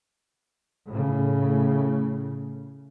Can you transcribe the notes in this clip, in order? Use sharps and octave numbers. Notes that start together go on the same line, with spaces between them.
A2 C#3